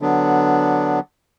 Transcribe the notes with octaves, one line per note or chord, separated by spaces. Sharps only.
D3 F#3 B3 D4